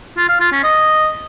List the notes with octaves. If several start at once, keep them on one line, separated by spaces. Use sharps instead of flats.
F4
F5
F4
C#4
D#5